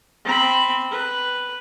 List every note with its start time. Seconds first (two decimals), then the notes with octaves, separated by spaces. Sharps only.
0.25 C4 B5
0.91 B4